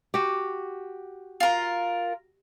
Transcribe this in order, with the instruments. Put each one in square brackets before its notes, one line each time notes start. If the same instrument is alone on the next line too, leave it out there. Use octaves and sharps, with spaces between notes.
[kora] F#4 G4
[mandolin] F4 A#4